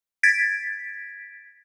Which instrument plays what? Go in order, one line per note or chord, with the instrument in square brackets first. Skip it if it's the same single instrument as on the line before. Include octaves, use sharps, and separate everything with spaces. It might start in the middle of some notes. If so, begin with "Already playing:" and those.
[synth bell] G#6 A6 B6 D7